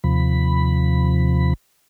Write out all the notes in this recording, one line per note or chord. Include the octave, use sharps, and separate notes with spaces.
D#2 C3 F3 B5